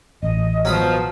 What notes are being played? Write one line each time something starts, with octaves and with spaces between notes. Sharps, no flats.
A1 D#5
B2 F3 F#3 B5 D#6 F6